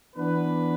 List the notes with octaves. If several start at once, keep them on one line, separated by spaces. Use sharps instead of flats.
E3 B3 D4 B4